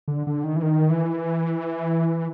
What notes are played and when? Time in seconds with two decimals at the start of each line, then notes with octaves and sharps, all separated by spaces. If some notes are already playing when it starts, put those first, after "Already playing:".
0.08 D3
0.27 D3
0.44 D#3
0.56 E3
0.63 D#3
0.90 E3